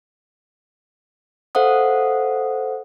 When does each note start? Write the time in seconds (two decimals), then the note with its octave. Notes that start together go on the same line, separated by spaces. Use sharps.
1.55 A4 C5 F5 F#5 D#6